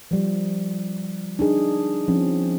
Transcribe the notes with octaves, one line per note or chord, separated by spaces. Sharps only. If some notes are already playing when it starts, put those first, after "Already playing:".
F3 G3
D4 D#4 G#4
F3 C4 C#4